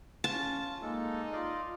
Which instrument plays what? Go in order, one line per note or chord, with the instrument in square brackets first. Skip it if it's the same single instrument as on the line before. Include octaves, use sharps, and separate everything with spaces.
[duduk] C#4 [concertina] F4 [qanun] A5
[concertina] G#3 A4 [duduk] A#3 [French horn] D#4
[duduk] F4 [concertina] D5 D#5 F5